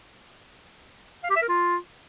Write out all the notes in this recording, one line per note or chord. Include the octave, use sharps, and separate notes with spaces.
F5
G4
E5
A#4
F4